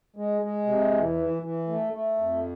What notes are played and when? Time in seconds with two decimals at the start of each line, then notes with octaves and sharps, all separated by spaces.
0.16 G#3
0.42 G#3
0.66 C3
0.92 E2
1.17 E3
1.42 E3
1.68 A3
1.93 A3
2.18 F2